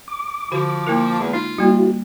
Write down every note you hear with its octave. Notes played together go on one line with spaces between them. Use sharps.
D6
D3 F3 F#4 C5
A#3 E4 A#4
E2 G#3
D#4 F4
G3 A#3 E4 F#4